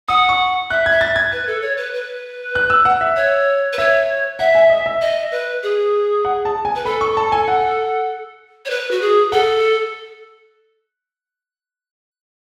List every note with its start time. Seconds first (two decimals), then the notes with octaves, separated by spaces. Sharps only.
0.08 F#5 D#6
0.29 C#6
0.70 E5 F#6
0.86 G#6
0.91 E5
1.01 A6
1.16 G#6
1.32 B4
1.47 A4
1.62 C#5
1.77 B4
1.94 B4
2.55 F#6
2.70 E6
2.85 F#5
3.01 E5
3.16 C#5
3.73 B4
3.78 C#5 E5
4.39 E5 F#5
4.55 G#5
4.70 D#5
4.86 E5
5.02 D#5
5.32 B4
5.63 G#4
6.25 F#5
6.45 A5
6.65 G#5
6.76 B4
6.85 A4 B5
7.01 C#6
7.17 A5
7.32 G#5
7.48 F#5
8.65 C#5
8.70 B4
8.91 F#4
9.01 G#4
9.32 A4 F#5